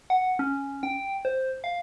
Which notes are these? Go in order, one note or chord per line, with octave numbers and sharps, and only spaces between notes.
F#5
C#4
G5
C5
F5